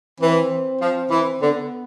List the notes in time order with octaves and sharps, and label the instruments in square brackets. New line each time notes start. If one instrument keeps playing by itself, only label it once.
[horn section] E3 [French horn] C4
[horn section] F3
E3
[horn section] D3 [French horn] B3